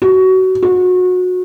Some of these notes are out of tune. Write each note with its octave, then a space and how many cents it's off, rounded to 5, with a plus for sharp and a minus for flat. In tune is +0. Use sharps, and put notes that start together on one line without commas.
F#4 +25
F#4 -25